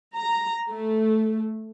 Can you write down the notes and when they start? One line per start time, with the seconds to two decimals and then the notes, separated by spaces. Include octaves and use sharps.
0.15 A#5
0.70 A3